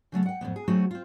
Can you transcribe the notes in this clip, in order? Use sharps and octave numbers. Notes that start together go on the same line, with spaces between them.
C#3 F#3 A3 B3
F#5 G5
F2 A2 F#3 B3
G#4
F#3 A3 C4 D#4 F#4 G#4
C4 F4